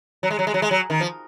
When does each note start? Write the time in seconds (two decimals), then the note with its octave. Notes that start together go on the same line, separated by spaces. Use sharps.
0.23 F#3
0.30 G#3
0.39 F#3
0.47 G#3
0.54 F#3
0.62 G#3
0.71 F#3
0.90 D#3
1.01 F3